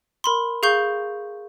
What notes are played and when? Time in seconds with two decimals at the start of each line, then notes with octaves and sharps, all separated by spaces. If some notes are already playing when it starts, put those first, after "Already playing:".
0.24 A#4 B5 C6
0.63 G#4 F5 C#6 G6 G7